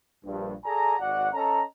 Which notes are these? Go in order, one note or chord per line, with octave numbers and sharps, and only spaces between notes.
A#1 G2
G#4 A4 D5 G#5 A#5
G#1 F#4 D5 F#5
C#4 A4 D#5 A#5